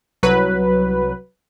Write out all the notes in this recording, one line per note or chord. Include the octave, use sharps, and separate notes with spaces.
C2 F#3 B4